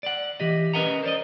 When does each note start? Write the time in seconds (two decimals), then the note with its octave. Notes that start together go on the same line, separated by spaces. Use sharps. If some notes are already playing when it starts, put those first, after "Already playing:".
0.03 D5 F#5
0.40 E3 G4 D#5
0.73 C#4 A#4 B4 D#5 F#5 A#5
1.03 C5 D5 D#5